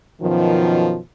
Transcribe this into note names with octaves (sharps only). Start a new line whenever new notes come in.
F#2 B2 D#3 F3